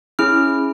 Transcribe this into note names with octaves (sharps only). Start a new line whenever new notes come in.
C#4 E4 G#4 F6